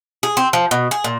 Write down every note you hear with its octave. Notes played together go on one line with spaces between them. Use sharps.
G#4
C4
F3
B2
G#4
A#2